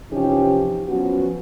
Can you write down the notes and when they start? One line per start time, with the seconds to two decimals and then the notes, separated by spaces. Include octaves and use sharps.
0.11 C3 E3 F3 C#4 D#4 G4
0.88 F3 F#3 B3 C#4 F#4